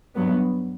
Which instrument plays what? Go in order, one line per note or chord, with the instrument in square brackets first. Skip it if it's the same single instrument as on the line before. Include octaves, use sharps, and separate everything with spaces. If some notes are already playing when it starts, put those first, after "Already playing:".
[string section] G2 F#3 B3